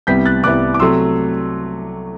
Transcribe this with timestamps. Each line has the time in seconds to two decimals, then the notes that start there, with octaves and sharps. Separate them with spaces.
0.07 C2 C3 G3 B3 E4 G6 B6
0.25 F#6 A6
0.44 C2 C3 G3 B3 E4 D6 F#6
0.74 D6
0.80 C3 F#3 A3 C6 E6